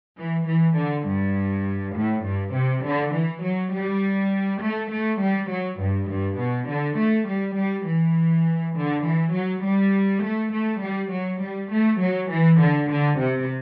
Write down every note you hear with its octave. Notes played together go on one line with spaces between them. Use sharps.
E3
E3
D3
G2
A2
G2
C3
D3
E3
F#3
G3
A3
A3
G3
F#3
G2
G2
B2
D3
A3
G3
G3
E3
D3
E3
F#3
G3
A3
A3
G3
F#3
G3
A3
F#3
E3
D3
D3
C3